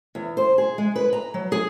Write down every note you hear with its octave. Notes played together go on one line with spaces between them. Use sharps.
E2
C5
G#4
G#3
B4
A#5
F#3
G#4